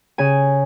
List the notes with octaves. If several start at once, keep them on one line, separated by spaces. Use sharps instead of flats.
C#3 G#5